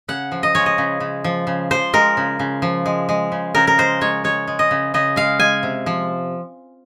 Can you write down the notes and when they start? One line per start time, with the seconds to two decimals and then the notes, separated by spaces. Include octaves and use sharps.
0.08 C#3 F#5
0.32 F3
0.43 D#5
0.55 G#3 C#5
0.66 D#5
0.78 C#3
1.00 C#3
1.24 F3
1.47 C#3
1.71 F3 C5
1.93 G#3 A#4
2.17 C#3
2.39 C#3
2.62 F3
2.86 G#3
3.09 G#3
3.32 C#3
3.55 C#3 A#4
3.67 A#4
3.78 G#3 C5
4.01 G#3 C#5
4.24 G#3 C#5
4.47 G#3
4.59 D#5
4.71 C#3
4.94 C#3 D#5
5.16 G#3 F5
5.39 G#3 G#5
5.63 C3
5.86 F3